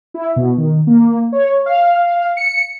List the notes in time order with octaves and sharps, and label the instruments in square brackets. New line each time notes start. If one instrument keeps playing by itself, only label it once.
[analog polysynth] E4
B2
D#3
A#3
C#5
F5
C#7